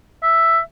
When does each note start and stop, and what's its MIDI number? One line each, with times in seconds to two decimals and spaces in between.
0.23 0.59 76